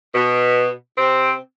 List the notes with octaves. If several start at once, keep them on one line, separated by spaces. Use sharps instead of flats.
B2
C3 C4